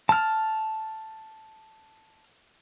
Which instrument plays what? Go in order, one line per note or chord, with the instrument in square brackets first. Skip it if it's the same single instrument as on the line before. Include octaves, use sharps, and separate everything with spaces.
[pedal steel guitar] A5 F6